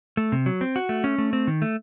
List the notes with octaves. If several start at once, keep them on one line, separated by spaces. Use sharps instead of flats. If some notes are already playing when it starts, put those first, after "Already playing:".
A3
C3
F#3
C4
F#4
A3
C#4
A3
C4
D#3
A3